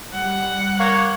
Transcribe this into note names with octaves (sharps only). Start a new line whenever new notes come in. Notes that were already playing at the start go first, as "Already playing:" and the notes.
G3 F#5
A#3 C#5